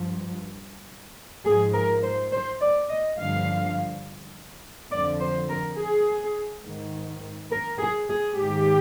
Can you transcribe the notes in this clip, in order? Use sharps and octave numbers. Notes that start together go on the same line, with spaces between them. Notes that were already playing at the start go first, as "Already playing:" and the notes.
Already playing: G2 F3
G#2 F3 G#4
A#4
C5
C5
D5
D#5
G2 D3 F3 F5
F2 D3 F3 D5
C5
A#4
G#4
G#2 D#3
A#4
G#4
G#4
G#2 D#3 G4